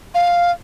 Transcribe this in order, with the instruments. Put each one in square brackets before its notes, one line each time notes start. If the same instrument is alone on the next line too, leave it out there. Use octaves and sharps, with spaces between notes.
[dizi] F5